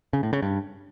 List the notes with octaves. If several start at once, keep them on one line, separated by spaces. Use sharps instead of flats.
C#3
A2
C#3
G2